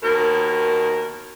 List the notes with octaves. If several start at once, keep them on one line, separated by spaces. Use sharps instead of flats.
D#2 B2 A#4